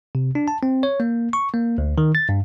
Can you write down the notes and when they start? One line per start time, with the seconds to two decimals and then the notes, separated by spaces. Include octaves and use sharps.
0.15 C3
0.35 D4
0.48 A5
0.63 C4
0.83 C#5
1.00 A#3
1.33 C#6
1.54 A#3
1.78 D2
1.98 D#3
2.15 A6
2.29 G2